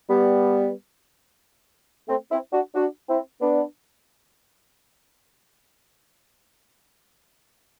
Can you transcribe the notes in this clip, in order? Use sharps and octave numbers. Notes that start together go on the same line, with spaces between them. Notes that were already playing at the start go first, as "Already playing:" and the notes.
G3 B3
A3 C4
C4 E4
D4 F#4
D4 F#4
C4 E4
B3 D4